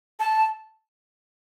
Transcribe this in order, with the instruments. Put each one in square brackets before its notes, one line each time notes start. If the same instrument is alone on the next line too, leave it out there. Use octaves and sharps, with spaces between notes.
[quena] A5